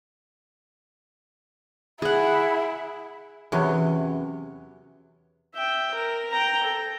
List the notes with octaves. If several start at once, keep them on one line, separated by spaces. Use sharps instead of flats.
E4 G#4 F#5
E2 C3 F#3 C#4 G4
E5 G5
A#4
G5 A#5
A4